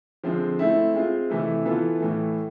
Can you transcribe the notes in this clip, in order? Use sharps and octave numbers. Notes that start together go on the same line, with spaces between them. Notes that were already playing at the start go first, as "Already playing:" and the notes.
D3 F3 G#3 C4
A3 C4 E4
G#3 C4 F4
C3 E3 A3 E4
E3 B3 F4 A4
A2 E3 A3